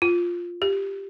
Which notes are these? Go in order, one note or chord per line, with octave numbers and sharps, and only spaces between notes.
F4
G4